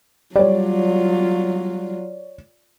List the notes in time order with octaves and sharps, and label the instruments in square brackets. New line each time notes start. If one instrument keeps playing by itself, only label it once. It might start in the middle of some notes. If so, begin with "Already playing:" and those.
[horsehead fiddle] F#3 F4 [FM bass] G3 [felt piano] C#5 D5